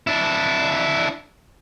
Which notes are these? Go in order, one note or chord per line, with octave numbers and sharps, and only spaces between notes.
D4 E4